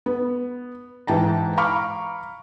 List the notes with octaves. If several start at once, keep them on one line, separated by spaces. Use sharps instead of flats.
B3
G#2 E3 G5 A5 A#5
F5 A#5 B5 C#6 D6 F6